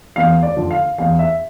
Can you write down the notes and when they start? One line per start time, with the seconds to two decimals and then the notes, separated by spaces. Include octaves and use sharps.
0.16 E2 F5
0.43 D5
0.56 D3 F3
0.71 F5
0.98 E2 F5
1.19 E5